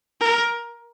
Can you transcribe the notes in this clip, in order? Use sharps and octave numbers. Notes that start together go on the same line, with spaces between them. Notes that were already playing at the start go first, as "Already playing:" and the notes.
A#4